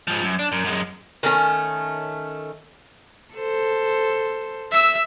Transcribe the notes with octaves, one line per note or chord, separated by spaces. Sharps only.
G#2 F3
F#2
D4
F#2
F#2 G#3
D#3 A3 C4 C#4
A4 C5
E5 E6